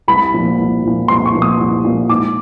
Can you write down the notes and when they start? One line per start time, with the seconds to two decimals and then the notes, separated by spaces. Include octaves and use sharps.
0.08 C2 B5
0.34 A#2 F3
0.58 C2
0.83 A#2 F3
1.08 C2 C6
1.26 C#6
1.34 A#2 F3
1.42 D#6
1.59 C2
1.84 A#2 F3
2.09 G#2 D6